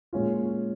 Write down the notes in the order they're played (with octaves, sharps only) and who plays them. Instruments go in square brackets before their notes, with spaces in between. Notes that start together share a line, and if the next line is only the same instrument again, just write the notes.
[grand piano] A#2 G#3 C#4 F4